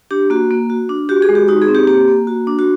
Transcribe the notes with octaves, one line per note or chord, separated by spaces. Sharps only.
D4 G4
A#3 F#4
A#3
F#4
D4
F#4 G4
G#4
G#3
G4
D#4 F#4
G#4
C4
G4
A#3 G4
A#3
F#4
D4
F#4